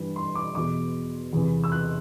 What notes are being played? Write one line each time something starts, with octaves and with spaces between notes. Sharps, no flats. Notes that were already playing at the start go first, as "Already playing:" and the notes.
Already playing: G2 E3
C6
D6
E2 B2 D6
E2 C3 E3
E6
F#6